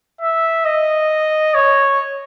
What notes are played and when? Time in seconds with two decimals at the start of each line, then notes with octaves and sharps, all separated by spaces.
0.21 E5
0.65 D#5
1.54 C#5